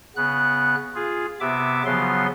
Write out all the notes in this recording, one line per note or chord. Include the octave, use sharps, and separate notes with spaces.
C#3 B3 F#6
F4 G#4
C3 B3 E5 D6
C#3 F3 F#3 B3 C6